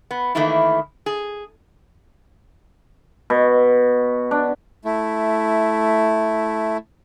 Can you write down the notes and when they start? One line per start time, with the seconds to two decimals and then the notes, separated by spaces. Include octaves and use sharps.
0.11 B3
0.35 D#3 E3 A3 A#3 E4
1.06 G#4
3.30 B2
4.31 D4
4.85 A3 E4